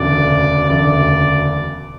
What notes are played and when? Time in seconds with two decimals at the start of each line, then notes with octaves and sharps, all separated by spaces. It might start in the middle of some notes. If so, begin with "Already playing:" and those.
Already playing: E1 D2 C#3 D5
0.69 E1 D2 C#3 D5